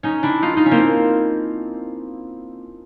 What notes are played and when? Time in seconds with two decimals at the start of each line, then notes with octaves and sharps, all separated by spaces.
0.03 C#4 D#4
0.23 D4 E4
0.42 D#4 F4
0.56 D#4 F4
0.66 C#4
0.71 A#3 C4